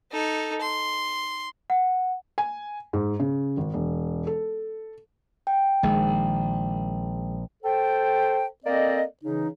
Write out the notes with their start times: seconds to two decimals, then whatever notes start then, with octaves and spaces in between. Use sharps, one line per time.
0.12 D#4 A4
0.61 C6
1.70 F#5
2.38 G#5
2.93 G#2
3.20 C#3
3.57 G#1
3.74 E1
4.27 A4
5.47 G5
5.83 A#1 D#3 G#3
7.63 A4 C5 G5
8.65 A#3 C4 A4 D5 D#5
9.24 C#3 E3 D#4